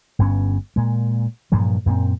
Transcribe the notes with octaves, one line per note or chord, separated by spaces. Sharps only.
G1 G2 B3 C#4
A#2 G#3
G2 A#2 F3 F#3
F#2 A#2 A#3 C4